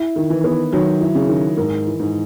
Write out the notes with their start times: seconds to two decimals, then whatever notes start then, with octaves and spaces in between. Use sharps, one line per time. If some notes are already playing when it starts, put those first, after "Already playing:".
Already playing: E4
0.16 D#3
0.30 E3
0.44 B3
0.72 D#3 F#3
1.01 E4
1.15 C#3
1.29 D#3
1.57 G#2 A#4
1.86 E3
1.99 G#2